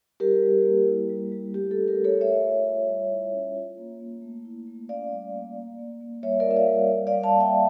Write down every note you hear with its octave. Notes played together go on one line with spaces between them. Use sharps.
G3 G4 A#4
G3
A#3
E4
G3
G3
A3 G4
A4
C#4
G4 A#4
A3
A4 C#5
A3 C#5 E5
F4
F4
G3
E4
C#4
F4
A#3
A#3
A3
E4
A3
C#4 D5 F5
G3
A#3
A#3
A#3
A#3
G3 C#5 E5
A#4 D5
F4
E5
D5 F5
G3
G3
D5 F5
G3
F5 A5
A#3
E5 G5